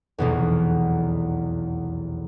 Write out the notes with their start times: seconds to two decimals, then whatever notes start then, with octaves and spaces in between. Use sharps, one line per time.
0.18 F1 B1 E2